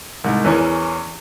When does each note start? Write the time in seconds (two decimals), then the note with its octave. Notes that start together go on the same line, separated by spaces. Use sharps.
0.24 C2 G#2
0.44 E2 E3 C#4 A#4 C#6